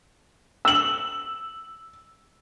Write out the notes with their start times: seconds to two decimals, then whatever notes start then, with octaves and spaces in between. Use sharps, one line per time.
0.65 E6 F#7